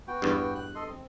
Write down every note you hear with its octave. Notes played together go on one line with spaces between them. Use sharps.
B3 F#4 G5
E2 G2
F#6
A4 D#5 C6
C4